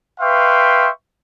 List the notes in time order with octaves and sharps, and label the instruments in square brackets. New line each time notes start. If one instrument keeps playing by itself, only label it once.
[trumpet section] B4 E5 F5 G5 C6 C#6